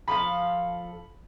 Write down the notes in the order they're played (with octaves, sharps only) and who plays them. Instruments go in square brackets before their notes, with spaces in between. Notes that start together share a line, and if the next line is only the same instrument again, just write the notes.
[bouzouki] F3 A4 F5 [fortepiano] B5